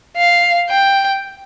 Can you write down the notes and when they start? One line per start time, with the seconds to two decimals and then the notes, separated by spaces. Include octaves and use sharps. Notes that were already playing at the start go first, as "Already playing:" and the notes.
0.17 F5
0.70 G5